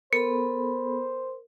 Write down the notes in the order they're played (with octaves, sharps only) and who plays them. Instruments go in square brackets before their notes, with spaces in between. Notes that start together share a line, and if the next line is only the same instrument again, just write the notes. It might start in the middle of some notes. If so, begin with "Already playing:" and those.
[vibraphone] B3 A4 B5 [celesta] A#4 [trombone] C5 [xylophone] C#7